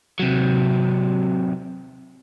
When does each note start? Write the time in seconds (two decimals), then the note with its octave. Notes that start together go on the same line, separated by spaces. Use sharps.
0.20 C3 F#3